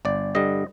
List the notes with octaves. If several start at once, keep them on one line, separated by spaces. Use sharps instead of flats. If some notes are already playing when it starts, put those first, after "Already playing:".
G1 D5
G2 D3 G3 D#5